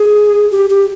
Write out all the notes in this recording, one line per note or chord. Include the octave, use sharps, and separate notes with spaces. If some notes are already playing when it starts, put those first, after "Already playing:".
Already playing: G#4
G4
G4